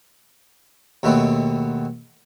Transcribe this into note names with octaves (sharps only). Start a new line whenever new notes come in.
D#2 B2 A3 B3 C4